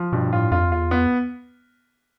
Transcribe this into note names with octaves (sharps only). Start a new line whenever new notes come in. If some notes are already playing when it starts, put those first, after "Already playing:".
Already playing: F3
G2 B2
A2 F4
F2 F4
E2 F4
B3